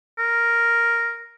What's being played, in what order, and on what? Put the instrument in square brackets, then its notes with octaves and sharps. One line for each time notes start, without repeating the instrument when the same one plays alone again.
[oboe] A#4